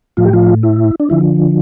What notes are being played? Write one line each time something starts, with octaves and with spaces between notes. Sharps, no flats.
A2 F3 F4
G4
F3 F4
E4
D4
D3 F3 E4